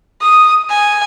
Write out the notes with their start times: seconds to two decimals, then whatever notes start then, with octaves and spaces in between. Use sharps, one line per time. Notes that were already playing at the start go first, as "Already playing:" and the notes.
0.22 D#6
0.70 G#5